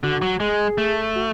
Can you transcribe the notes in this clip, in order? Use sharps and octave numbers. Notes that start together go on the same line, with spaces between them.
D3 F#4
F#3
G#3 G#4
A3
F#4